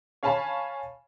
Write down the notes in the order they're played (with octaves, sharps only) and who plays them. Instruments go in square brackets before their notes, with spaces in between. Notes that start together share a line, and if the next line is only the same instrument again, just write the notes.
[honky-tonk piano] C#5 F5 G#5 A5 B5